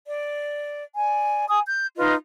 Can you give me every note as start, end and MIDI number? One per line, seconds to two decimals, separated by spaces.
0.06 0.84 74
0.96 1.46 74
0.96 1.46 80
1.49 1.60 80
1.49 1.60 87
1.67 1.87 91
1.96 2.14 63
1.96 2.14 65
1.96 2.14 71
1.96 2.14 75